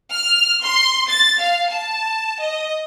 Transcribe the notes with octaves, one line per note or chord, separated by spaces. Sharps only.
F6
C6
A6
F5
A5
D#5